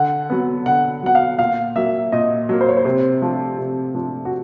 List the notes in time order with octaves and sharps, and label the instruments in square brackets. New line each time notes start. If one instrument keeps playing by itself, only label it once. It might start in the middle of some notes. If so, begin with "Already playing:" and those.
Already playing: [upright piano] D3 [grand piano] F#5
[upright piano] F#3 B3
[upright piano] D3 [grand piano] F#5
[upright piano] F#3 B3 [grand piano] F#5
[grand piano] F5
[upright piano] A#2 [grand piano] F5
[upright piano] F#3 A#3 [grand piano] E5
[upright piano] A#2 [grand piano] D#5
[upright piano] F#3 A#3
[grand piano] C5
C#5
C5
[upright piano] C3
F3 A3 D4 F4
C3
F3 A3 D4 F4
[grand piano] F#4